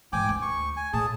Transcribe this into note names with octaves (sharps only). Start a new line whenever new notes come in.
G#2 E3 G5 G#5 D6
D2
C#6
G#5
A2 G#4 A5